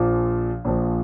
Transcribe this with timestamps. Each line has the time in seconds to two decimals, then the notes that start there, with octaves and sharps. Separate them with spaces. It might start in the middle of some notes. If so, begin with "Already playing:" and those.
Already playing: A#1 A#2 F3
0.65 A#1 A#2 F3